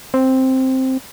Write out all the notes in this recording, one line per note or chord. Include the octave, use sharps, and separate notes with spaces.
C4